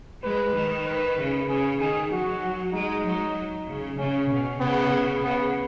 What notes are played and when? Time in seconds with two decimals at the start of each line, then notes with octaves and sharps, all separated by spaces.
0.24 G#3 B4
0.55 D#3
0.86 B4
1.18 C#3
1.48 C#3 G#4
1.79 D#3 G#4
2.11 F#3 F#4
2.74 G#3 D#4
3.05 F#3
3.67 C#3
3.98 C#3 C#4
4.30 B2
4.60 C#3 B3
5.23 C#3 B3